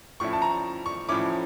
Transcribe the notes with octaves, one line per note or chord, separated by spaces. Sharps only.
A2 F3 C#4 E4 C#6
A5
A#5
C#6
A2 F3 C#4 E4 D6